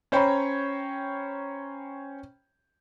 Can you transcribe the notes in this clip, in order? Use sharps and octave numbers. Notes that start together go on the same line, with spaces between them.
C#4 C5 C#5 G5 A#5 B5